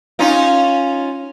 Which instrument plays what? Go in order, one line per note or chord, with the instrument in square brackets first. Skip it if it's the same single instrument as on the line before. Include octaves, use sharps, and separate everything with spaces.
[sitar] C#4 D#4 F4